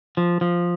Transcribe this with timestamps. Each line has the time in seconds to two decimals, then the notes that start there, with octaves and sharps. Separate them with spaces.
0.17 F3
0.41 F3